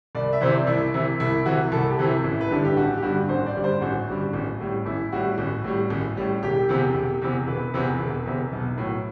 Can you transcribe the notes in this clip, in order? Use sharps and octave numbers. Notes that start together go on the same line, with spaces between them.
C2 D5
E5
C3 E3 C5
D5
C2 E4
C3 E3 E4
C2 E4
C3 E3 F#4
C2 A4
G4
C3 E3
E4
A1
B4
G2 D3 G3 A4
G4
A1 F#4
G4
G2 D3 G3 F#4
A1 C5
D5
G2 D3 G3
C5
A1 F#4
G2 D3 G3
A1
A2 G3
A1 E4
A2 G3 F#4
A1
A2 G3
A1
A2 G3
E1 G4
E2 C3
E1
E2 C3
E1 B4
E2 C3
E1
E2 C3
B1
A2 F#3